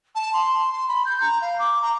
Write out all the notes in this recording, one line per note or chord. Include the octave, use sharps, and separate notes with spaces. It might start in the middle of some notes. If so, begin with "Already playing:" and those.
A5
C6
C6
B5
G6
A#5
F5
D6
A#5